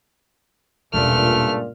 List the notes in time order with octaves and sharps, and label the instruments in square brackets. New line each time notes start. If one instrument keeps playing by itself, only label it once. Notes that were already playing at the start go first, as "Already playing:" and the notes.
[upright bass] E1 [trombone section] C#2 G2 A#2 [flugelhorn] A3 [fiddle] F6